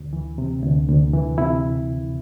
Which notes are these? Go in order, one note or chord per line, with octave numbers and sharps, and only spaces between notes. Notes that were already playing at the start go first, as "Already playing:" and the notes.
Already playing: D2
E3
C3
D2
D2
E3
C3 E4